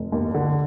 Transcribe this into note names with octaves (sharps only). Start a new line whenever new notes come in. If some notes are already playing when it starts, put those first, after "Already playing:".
Already playing: F1
D#2
D3